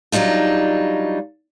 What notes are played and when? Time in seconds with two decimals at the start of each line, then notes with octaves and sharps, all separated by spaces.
0.12 F#3 G3 D4 D#4 F4